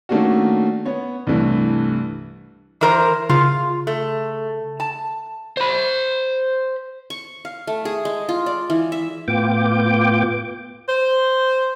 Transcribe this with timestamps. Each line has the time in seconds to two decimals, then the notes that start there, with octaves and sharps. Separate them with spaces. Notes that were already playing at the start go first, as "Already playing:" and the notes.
0.09 D#3 A3 A#3 C#4 D4 F#4
0.85 B3 C#5
1.27 C2 G2 E3 A3
2.81 E3 A#4 C5
3.29 C#3 F4
3.87 A3
4.80 A5
5.57 C5 B5
7.10 C#6
7.45 F5
7.67 A3
7.85 G#4
8.05 G#3
8.29 F4
8.46 D5
8.70 E3
8.92 E5
9.28 A2 B3 F4 G5 D6
10.89 C5